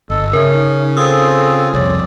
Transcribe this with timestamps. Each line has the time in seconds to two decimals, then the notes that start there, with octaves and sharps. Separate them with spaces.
0.10 G1 A4 D#5
0.33 C#3 C#4 A#4 E5
0.53 D#4
0.97 C4 F4 G#4 A4 D#6 E6
1.74 C2 F2 C#5 D5